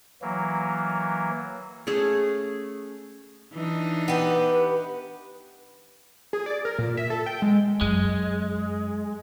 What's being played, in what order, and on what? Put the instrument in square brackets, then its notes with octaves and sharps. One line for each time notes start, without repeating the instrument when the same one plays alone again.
[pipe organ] E3 F#3 A#3
[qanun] A3 C#4 G#4
[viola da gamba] E3 D4 D#4
[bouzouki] B3 G4 [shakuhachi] B4
[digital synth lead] G#4
D5
A#4
A#2
E5
A4
G5
G#3
[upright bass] F#2 [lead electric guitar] G#3